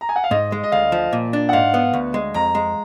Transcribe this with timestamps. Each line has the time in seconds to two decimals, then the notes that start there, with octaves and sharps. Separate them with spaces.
0.01 A#5
0.09 G#5
0.16 F#5
0.24 F5
0.31 G#2 D#5
0.52 G#3
0.63 D#5
0.72 D2 F5
0.92 F3
1.13 A#2
1.33 D4
1.49 F#5
1.53 G#2 F5
1.74 B3
1.93 D2
2.14 G#3
2.34 F2 A#5
2.55 G#3